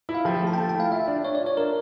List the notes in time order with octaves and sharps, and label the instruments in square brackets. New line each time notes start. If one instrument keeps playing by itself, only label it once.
[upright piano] E4
[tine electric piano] F5
[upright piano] F3 [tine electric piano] G5
[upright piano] A3 [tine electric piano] A5
[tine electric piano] G5
[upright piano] A3 [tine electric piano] A5
[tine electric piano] G5
[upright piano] E4 [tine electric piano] F5
[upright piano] F4 [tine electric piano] E5
[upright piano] D4
[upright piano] D4 [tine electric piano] C#5
[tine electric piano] D5
[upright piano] F4
[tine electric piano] C#5
[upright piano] D4 [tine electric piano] A#4